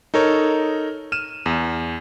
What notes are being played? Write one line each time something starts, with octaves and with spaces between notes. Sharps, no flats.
D#4 A4 A#4 C#5
F6 D#7 E7
E2